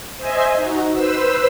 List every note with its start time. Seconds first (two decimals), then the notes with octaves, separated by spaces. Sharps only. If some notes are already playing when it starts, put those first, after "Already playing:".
0.18 C5 D#5 E5 G#5
0.56 D#4 F#4
0.93 B4 C5 E6